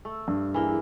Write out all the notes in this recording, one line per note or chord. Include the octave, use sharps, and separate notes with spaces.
A3 E6
G2
E3 A#3 E4 G#4